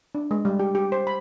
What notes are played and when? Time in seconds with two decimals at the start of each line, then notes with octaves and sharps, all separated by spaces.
0.15 D4
0.31 G#3
0.45 G3
0.60 G4
0.75 G4
0.92 C5
1.07 B5